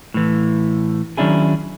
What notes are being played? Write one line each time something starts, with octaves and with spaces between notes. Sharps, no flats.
A2 E3
D#3 F#3 C#4 D4 E4 G#4